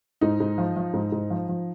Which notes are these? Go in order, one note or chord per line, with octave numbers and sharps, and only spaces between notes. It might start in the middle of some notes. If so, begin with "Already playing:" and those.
G#2 D#4
G#2
F3
F3
G#2
G#2
F3
F3